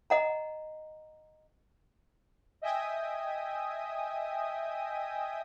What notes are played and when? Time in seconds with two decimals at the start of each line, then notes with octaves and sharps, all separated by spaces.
0.10 D#5 F#5 A#5
2.62 D#5 E5 G5 G#5 D#6